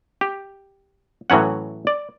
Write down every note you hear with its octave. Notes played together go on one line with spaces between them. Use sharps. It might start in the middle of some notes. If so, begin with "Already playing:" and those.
G4
A2 E3 F#3 C#4 F#5
D5